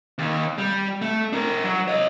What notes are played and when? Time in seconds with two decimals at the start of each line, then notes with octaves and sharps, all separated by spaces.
0.18 D#2
0.58 G3
1.02 A3
1.33 D4 A#4
1.64 F#3
1.88 C#5 D#5